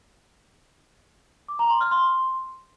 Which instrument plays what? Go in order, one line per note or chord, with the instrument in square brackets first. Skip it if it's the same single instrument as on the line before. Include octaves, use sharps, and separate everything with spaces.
[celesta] D6
A#5
C6
F6
C6